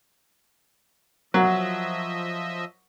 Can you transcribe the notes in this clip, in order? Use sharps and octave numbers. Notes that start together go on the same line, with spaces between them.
F3 F#3 A#4 C5 D#5 E5 F#5